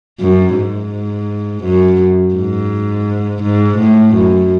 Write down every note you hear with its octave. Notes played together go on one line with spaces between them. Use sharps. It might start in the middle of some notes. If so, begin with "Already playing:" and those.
F#2
G#2
F#2
G#2
G#2
A2
F#2